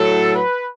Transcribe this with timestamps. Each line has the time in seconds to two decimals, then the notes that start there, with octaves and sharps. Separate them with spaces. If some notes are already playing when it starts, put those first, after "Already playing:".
Already playing: A2 F#3 A4
0.33 B4